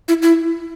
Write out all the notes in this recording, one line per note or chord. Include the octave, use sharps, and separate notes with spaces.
E4
E4